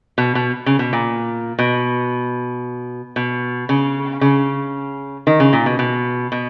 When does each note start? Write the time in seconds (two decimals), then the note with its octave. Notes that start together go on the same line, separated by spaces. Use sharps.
0.18 B2
0.35 B2
0.66 C#3
0.79 B2
0.93 A#2
1.59 B2
3.16 B2
3.69 C#3
4.21 C#3
5.27 D#3
5.40 C#3
5.53 A#2
5.66 B2
5.79 B2
6.32 B2